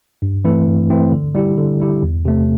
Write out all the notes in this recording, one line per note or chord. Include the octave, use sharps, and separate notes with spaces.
G2
E3 A3 C4 E4
G2
E3 A3 C4 E4
D3
G3 E4 G4
D3
G3 E4 G4
E2
C3 A3